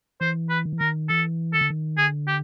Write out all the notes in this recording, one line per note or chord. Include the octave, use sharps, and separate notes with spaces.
E3 C5
B4
D#3
E3
D#3 A#4
E3 A4
D#3 A4
D3
D#3
D3 G#4
G4